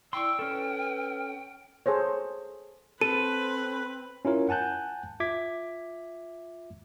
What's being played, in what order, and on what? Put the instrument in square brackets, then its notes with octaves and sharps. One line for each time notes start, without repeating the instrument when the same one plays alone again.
[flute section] E4 D5 E6 [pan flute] G5 [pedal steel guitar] C6 C#6
[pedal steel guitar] C#4 A4 [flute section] B4 F6
[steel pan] G#4 A4 C5 C#5
[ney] C4 [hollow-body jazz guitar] A4 [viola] B4 [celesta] D#7
[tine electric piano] C#4 E4 F4 A#4 C#5
F#5 G#5 A5 F#6 G6
F4 E5 D6 G#6 B6